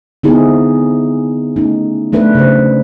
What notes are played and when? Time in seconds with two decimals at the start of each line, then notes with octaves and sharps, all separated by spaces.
0.23 D3 B3 C4 D#4 E4 G#4
1.56 A3 C#4 D#4
2.12 F#3 A3 D4 B4
2.35 C#3 C5